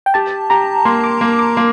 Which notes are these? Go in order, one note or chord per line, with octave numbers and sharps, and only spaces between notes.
G5
G4 A5
G4 A#5
A#3 C6
D6
A#3 C6
D6
A#3 C6